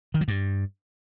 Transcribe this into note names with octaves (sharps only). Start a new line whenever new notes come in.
D#3
F#3
G2